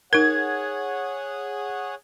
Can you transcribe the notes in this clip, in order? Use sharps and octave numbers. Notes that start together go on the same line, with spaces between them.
D#4 G#4 A#4 C#5 F#5 G#6